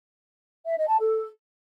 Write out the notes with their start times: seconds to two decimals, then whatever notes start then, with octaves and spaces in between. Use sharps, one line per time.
0.65 E5
0.77 D#5
0.88 A5
1.00 A4